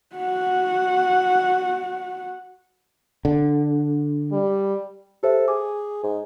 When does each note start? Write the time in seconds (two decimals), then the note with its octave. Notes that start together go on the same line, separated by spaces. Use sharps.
0.16 F#4 F#5
3.25 D3
4.32 G3
5.23 G4 A4 C5 E5
5.48 G#4 D6
6.03 G#2